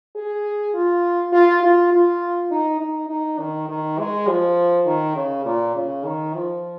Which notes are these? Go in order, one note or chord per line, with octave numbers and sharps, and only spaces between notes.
G#4
F4
F4
F4
F4
D#4
D#4
D#4
D#3
D#3
G#3
F3
D#3
C#3
A#2
C#3
D#3
F3